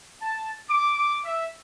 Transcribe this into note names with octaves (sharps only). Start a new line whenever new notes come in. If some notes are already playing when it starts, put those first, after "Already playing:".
A5
D6
E5